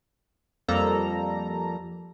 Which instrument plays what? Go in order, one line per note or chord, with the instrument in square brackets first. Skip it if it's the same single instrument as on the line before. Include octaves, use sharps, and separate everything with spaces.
[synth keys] F2 F3 G3 A#3 A4 A#5